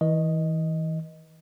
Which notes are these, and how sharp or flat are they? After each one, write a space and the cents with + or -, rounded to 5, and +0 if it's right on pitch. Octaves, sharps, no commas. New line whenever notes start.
E3 -35 D#5 +0